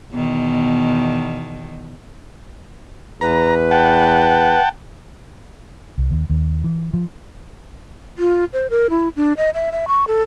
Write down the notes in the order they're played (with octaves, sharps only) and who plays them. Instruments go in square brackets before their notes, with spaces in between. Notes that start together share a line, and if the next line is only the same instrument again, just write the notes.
[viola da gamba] E2 B2 D#3
[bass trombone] E2 [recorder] B4 [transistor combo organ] A#5
[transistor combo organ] F#5 G5 A5
[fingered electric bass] C2
D#2
D#2
E3
F3
[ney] F4
C5
A#4
E4
D4
D#5
E5
E5
C#6
A4